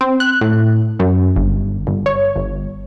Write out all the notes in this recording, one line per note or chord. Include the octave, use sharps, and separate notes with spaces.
C4
F#6
A2
F#2
G1
G1
C#5
G1